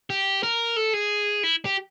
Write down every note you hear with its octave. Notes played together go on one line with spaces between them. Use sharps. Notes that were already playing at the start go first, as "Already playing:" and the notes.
G4
A#4
A4
G#4
E4
G4